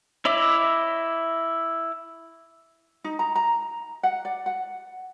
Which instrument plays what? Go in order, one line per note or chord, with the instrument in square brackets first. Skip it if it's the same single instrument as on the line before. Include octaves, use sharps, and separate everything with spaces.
[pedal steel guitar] E4 C#5 D#5 E5 D6
[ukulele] D#4
A#5
A#5
F#5
D5
F#5